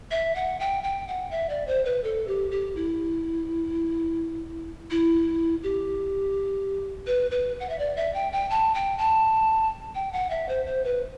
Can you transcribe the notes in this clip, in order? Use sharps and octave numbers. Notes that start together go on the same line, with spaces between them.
E5
F#5
G5
G5
F#5
E5
D5
C5
B4
A4
G4
G4
E4
E4
G4
B4
B4
F#5
E5
D5
E5
G5
G5
A5
G5
A5
G5
F#5
E5
C5
C5
B4